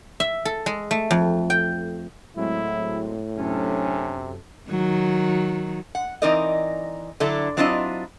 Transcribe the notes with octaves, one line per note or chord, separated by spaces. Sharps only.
E5
A4
G#3
A3
F2
G5
A2 F#3 G#3 C4 E4
F#2 C3 C#4 D4 A4
D#3 F#3
F#5
E3 C4 D#4 A#4 D5 D#5
D3 F#3 D4 E4 A4
F#3 C4 D4 E4 F4 D#5